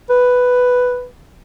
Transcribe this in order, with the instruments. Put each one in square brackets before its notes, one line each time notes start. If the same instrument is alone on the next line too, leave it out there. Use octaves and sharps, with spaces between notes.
[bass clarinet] B4